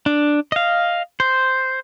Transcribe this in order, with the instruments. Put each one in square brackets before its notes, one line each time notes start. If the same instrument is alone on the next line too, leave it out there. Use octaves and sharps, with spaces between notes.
[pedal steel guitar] D4
D#5 F5
C5